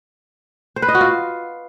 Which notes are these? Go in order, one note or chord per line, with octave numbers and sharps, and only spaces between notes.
C5
B4
D#5
F#4
F4